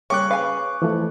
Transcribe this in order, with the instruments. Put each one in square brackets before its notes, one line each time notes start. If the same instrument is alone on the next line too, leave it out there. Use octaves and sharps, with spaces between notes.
[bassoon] C#3 [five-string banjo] G3 A#3 C#4 [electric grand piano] C#6 D6 F#6
[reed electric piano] B4 [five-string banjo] F5 G#5
[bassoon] F2 [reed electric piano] E3 F3 A3